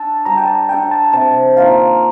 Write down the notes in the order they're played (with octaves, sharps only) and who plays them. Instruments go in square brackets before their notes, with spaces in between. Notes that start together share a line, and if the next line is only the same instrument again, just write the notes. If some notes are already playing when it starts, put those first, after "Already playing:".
Already playing: [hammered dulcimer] D4 A4 [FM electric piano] A5
[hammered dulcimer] G3 [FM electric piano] A#5
[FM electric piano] G5
A5
[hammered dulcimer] D4 A4 [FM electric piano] G5
[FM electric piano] A5
[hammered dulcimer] C3 [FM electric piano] A5
[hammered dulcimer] D#3 A#3 F4 [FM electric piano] F5